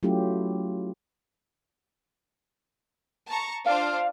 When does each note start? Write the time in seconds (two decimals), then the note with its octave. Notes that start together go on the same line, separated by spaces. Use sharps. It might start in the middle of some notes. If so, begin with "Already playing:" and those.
0.03 F#3 A3 C#4 E4 F4 G4
3.29 A5 A#5 C#6
3.66 D4 F4 C5 F5